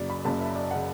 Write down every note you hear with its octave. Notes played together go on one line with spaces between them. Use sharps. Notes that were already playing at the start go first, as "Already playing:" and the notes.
Already playing: F#1 F#2 C#3 D5
B5
F#1 F#2 C#3 A5
E5
D5
F#5
C#3